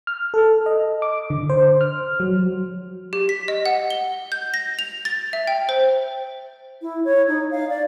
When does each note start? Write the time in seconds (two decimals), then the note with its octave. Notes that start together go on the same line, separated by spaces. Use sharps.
0.07 F6
0.34 A4
0.66 D#5
1.02 D6
1.30 D3
1.50 C5
1.81 F6
2.20 F#3
3.13 G4
3.29 B6
3.48 D#5
3.66 F#5
3.90 G7
4.32 G6
4.54 A#6
4.79 F7
5.05 A6
5.33 E5
5.47 G5
5.69 C5
6.82 E4
7.05 C#5
7.28 D#4
7.51 F5
7.69 D5